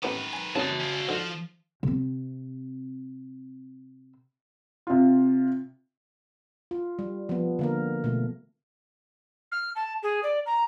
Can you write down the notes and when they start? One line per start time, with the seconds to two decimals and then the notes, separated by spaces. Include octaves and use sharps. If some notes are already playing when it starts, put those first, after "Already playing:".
0.03 A1 D#3 B3 B4 D6
0.33 G#5 A5
0.56 C2 G2 C#3 F#4 A5
0.80 C#4 F4
1.09 G#2 D3 F3
1.83 C3 C4
4.87 C3 F4
6.71 F4
6.99 G3
7.29 F3 B3
7.59 D3 A#3 A#4
8.04 B2 A3
9.51 F6
9.75 A5
10.03 G#4
10.23 D5
10.46 A#5